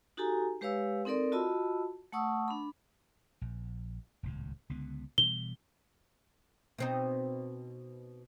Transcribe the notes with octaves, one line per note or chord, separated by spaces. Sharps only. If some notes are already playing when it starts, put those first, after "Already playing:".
D#4 F#4 G4 A4 G#5 A#5
G#3 G4 B4 C#5 F5 E6
C4 D#4 A4 A#4 D5 C6
F4 F#4 D#5 A5 B5 E6
A3 F#5 A5 C#6 D#6 E6
D4 B5
A#1
D#1 C#2 A2
C#2 D3 B3
B2 E3 G3 G7
B2 C4 D#4